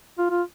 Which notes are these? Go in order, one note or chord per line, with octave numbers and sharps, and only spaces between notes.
F4
F4